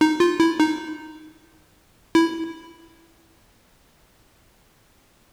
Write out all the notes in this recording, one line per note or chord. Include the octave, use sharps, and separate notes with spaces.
D#4
F4
E4
D#4
E4